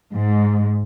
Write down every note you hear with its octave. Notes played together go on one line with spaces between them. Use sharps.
G#2